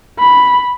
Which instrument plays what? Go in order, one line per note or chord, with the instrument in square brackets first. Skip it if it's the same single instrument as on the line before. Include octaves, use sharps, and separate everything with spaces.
[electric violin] B5